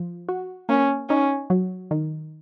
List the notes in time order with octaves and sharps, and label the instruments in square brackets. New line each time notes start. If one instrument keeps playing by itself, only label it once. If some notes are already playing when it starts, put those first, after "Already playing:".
Already playing: [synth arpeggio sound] F3
F#4
[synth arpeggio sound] A#3 [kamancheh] C#4
[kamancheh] C#4 [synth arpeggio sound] D#4
[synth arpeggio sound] F#3
D#3